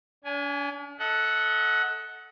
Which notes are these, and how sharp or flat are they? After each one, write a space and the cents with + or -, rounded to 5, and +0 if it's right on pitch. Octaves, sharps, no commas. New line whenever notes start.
D4 -45 G#5 +0
A4 +0 D#5 +35 F#5 +0